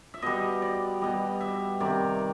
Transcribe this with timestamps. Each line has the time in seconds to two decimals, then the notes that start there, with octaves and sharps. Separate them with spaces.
0.14 E5
0.22 B2 G3 D#5
0.62 D5
1.01 B2 G3 D#5
1.41 E5
1.80 C3 D#3 G3 D5